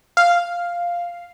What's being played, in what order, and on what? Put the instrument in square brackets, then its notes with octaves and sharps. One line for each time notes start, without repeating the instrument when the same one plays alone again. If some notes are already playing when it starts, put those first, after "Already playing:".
[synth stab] F5